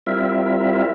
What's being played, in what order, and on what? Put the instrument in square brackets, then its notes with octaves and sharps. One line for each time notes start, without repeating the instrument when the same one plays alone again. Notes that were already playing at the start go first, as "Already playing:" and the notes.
[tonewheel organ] G3 C4 E4 F4 A#4 E5